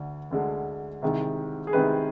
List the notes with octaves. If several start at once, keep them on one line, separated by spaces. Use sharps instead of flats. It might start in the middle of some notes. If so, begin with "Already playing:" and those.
Already playing: D2 D3
D2 D3 G#3
C2 C3 D#3 G#3
G#4
C2 C3 D#3 G#3 B4